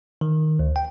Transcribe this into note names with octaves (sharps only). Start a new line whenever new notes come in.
D#3
D2
G5